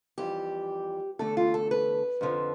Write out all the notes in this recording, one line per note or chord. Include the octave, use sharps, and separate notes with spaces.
F2 E3 G3 G4
E2 D3 A3 A4
F4
A4
B4
F2 D3 F3